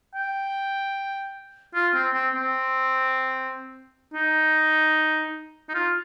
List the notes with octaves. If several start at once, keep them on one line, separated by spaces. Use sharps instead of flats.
G5
F4
C4
C4
C4
D#4
D#4
F4